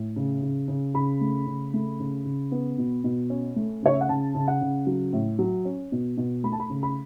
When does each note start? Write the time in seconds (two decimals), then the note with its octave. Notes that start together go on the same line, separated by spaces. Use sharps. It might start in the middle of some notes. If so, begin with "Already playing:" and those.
Already playing: A2
0.16 C#3
0.42 C#3
0.68 C#3
0.94 C#3 B5
1.21 A3
1.46 C#3
1.74 A3
2.00 C#3
2.25 C#3
2.52 B3
2.78 B2
3.04 B2
3.30 C#4
3.56 A3
3.83 C#3 C#5
3.93 E5
4.01 F#5
4.09 C#3 A5
4.35 C#3
4.48 F#5
4.61 C#3
4.87 F#3
5.13 A2
5.39 F#3
5.65 C#4
5.92 B2
6.17 B2
6.43 A3 B5
6.52 A5
6.60 B5
6.70 C#3
6.83 B5